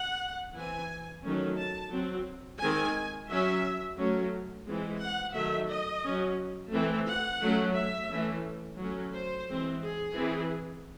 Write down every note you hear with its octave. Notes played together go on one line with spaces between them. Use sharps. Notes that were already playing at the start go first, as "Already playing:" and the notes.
Already playing: F#5
E3 C4 G#5
D#3 F#3 A3 C#4
A5
F#3 C4
D#3 G#3 C4 G#5
F#3 C#4 E5
F#3 A3 C#4
E3 G#3 C4
F#5
D#3 F#3 A3 E5
D#5
F#3 C#4
E3 A3 C4
F#5
F#3 A3 C#4
E5
E3 A3 C#4
F#3 A3 C#4
C5
E3 G#3 C4
G#4
E3 C4